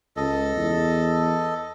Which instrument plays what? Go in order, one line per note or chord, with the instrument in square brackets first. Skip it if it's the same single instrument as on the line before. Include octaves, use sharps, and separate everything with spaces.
[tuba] C#2 [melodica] A4 D#5
[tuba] E2